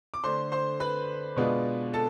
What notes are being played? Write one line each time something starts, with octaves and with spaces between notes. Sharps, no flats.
D6
D3 A3 D4 C5 C6
C5 C6
B4 B5
B2 G#3 B3 D4 F4
A4 A5